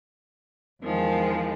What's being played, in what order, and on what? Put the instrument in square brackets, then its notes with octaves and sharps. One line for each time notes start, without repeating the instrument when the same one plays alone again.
[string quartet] E2 D#3 F3 G#3